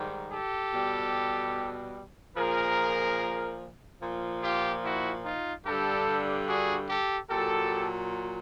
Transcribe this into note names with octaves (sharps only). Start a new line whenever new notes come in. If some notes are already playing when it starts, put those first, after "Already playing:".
Already playing: G#2 D#3 G3
G4 A4
B2 G3
A#2 F3 G#4 A#4
A#2 F3
F4 G4
E4 F#4
D#4 F4
G2 D3 G3 G4 A4
F#4 G#4
G4 A4
A#2 F#3 G4 A4